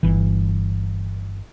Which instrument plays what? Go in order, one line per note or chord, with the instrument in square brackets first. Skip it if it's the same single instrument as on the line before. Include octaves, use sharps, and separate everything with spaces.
[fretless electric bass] G1 E3